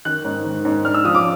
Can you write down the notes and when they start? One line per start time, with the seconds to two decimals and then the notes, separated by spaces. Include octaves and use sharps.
0.05 D#3 F#6
0.25 G#2
0.45 D#3
0.65 G#2
0.85 D4 F6
0.94 E6
1.04 F3 D#6
1.15 D6